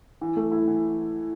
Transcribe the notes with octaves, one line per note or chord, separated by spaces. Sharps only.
E3
A3
E4
E3